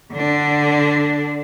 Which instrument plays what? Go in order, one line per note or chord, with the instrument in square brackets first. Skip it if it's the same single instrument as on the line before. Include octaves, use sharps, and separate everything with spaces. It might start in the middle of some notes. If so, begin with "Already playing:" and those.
[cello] D3 D4